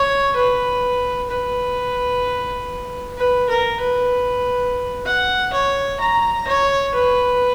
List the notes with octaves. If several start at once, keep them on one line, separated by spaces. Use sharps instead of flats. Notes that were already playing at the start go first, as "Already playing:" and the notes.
Already playing: C#5
B4
B4
B4
A#4
B4
F#5
C#5
A#5
C#5
B4